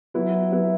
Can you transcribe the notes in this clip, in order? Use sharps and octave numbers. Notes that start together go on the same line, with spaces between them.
F#3 B3 E4 B4
F#3 B3 E4 B4